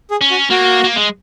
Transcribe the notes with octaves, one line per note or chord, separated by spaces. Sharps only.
G#4
C#4
F#4
A#3 F#4
A#3
G#3